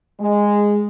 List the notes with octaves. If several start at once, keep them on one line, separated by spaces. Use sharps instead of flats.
G#3